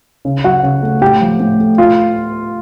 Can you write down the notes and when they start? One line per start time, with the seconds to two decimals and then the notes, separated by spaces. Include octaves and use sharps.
0.25 C#3
0.44 F#3 F#4 F#5
0.63 C#3
0.83 A3
1.01 A2 G4 G5
1.21 F3
1.40 A2
1.59 A3
1.78 A2 F4 F5